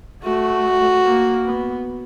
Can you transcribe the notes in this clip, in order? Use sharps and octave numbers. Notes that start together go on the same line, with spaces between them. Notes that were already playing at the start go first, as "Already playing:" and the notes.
A3 F#4
A#3
B3